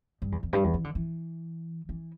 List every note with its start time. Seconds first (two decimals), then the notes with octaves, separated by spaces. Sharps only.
0.22 G2
0.32 E2
0.43 E2
0.53 G2
0.64 E2
0.74 E3
0.84 D3
0.95 E3
1.89 E3